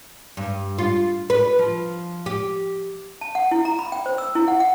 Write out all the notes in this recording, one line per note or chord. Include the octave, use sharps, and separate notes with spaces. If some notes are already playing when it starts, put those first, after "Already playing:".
G2
F4
B4
F3
G4
A5
F#5
E4
A#5
B5
G5
C5
E6
E4
F#5
F#5